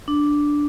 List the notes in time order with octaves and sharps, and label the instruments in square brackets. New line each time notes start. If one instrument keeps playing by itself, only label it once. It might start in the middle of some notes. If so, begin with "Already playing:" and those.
[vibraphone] D4